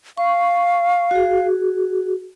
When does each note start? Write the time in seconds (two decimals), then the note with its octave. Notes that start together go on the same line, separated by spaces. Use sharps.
0.18 F5 C#6
1.11 F#4 G#4